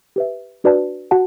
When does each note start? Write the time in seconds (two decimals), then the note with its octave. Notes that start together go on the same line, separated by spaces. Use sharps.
0.16 G4 B4 E5
0.64 D4 F#4 B4 D5 A5
1.11 F#4 F#5 A5